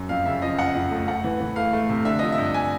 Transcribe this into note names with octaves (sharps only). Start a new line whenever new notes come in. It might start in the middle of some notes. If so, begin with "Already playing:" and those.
Already playing: F#2
F2 F5
C#3 E5
F3 D#5
F2 F#5
F2
A3
A3 F#5
E3
E3
A3 F5
A3
C3
D3 E5
F3 D#5
E5
G2
G#5